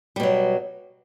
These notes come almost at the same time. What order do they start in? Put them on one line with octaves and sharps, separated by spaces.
G3 B2 F#3